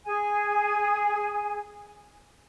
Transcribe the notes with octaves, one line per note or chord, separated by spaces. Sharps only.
G#4 G#5